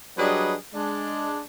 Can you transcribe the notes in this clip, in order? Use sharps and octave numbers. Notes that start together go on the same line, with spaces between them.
F#3 G3 D4 G#4 B4 D#5
G#3 D4